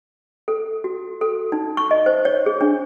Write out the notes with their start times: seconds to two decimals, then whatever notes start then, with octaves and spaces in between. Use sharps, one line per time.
0.48 A4
0.84 F#4
1.21 A4
1.52 D#4
1.77 C#6
1.91 D#5
2.06 C5
2.25 C#5
2.46 G#4
2.61 D4